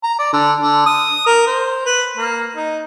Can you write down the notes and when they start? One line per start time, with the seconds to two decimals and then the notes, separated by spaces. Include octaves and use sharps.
0.03 A#5
0.19 D5
0.33 D3
0.61 D3
0.86 D#6
1.26 A#4
1.47 C5
1.85 B4
2.17 A#3
2.56 D#4